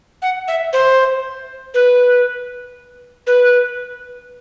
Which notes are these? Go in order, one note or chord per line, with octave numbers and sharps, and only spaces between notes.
F#5
E5
C5
B4
B4